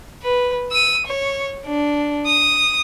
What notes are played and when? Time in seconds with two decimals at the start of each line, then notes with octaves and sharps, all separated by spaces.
0.23 B4
0.71 E6 D#7
1.07 C#5
1.67 D4
2.26 D#6